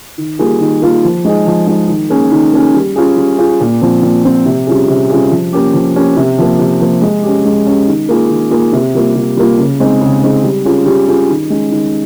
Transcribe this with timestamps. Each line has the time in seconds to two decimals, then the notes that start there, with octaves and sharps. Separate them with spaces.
0.18 D#3
0.39 G3 A#3 F4 G#4
0.60 D#3
0.82 G3 A#3 F4 G#4
1.04 F3
1.25 G#3 D#4 G#4
1.47 F3
1.67 G#3 D#4 G#4
1.88 D#3
2.10 A#3 C#4 G#4
2.31 D#3
2.52 A#3 C#4 G#4
2.74 G3
2.96 C#4 F4 G#4
3.17 G3
3.38 C#4 F4 G#4
3.60 A#2
3.82 F3 C4
4.02 A#2
4.24 F3 C4
4.46 C3
4.67 G3 C#4 F4 G#4
4.88 C3
5.10 G3 C#4 F4 G#4
5.31 F3
5.53 A#3 C#4 G4
5.73 F3
5.95 A#3 C#4 G4
6.17 C3
6.38 F3 A#3
6.59 C3
6.81 F3 A#3
7.02 G#3
7.23 C#4 G4
7.45 G#3
7.67 C#4 G4
7.88 D#3
8.09 A#3 F4 G#4
8.31 D#3
8.51 A#3 F4 G#4
8.73 C3
8.94 G3 A#3 F4
9.15 C3
9.37 G3 A#3 F4
9.58 C#3
9.80 G#3 C4 D#4 G#4
10.01 C#3
10.23 G#3 C4 D#4 G#4
10.44 G3
10.65 C#4 F4 G#4
10.86 G3
11.08 C#4 F4 G#4
11.29 D#3
11.50 G#3 C#4
11.71 D#3